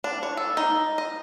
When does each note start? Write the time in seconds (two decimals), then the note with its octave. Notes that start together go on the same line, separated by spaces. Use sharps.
0.04 D4
0.23 C#5
0.37 A4
0.57 D#4
0.98 D#5